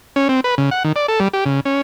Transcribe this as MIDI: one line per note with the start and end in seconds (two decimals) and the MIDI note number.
0.16 0.28 61
0.29 0.40 60
0.44 0.55 71
0.58 0.70 49
0.71 0.83 78
0.84 0.92 51
0.96 1.07 74
1.08 1.20 69
1.20 1.28 55
1.33 1.44 67
1.46 1.60 49
1.65 1.81 61